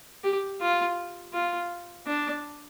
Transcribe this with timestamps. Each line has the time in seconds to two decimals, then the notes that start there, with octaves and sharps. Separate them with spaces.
0.24 G4
0.61 F4
1.33 F4
2.07 D4